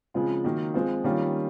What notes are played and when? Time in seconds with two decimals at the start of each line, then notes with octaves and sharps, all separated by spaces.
0.14 C#3 F3 G#3 C4 F4
0.44 D#3 F#3 A#3
0.74 F3 G#3 C4 F4
1.04 D#3 G3 A#3 C#4 F4